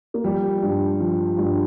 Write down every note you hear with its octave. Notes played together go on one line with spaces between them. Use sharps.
A#3
F3 G3
G2
F3
G2